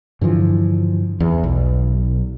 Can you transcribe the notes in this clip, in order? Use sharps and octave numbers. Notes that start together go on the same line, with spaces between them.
G2 D3 E3 F3
E2
B1